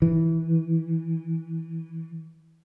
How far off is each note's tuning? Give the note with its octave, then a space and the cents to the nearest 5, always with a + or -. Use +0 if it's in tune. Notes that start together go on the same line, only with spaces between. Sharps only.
E3 -10